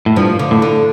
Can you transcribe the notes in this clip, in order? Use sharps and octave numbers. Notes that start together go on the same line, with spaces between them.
A2
G2 F3
D3
A2
D3